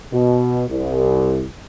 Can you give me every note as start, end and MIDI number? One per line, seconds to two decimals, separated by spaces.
0.13 0.64 47
0.69 1.44 36